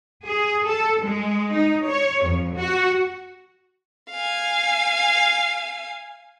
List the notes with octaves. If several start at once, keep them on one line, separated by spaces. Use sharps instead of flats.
G#4
A4
G#3
D#4
C#5
F2
F#4
F5 G#5